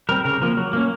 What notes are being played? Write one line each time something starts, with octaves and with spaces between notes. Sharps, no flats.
G3 C4 A#4
C#3 A#4
F3 A#3 A#4
F#3
A#3 C#4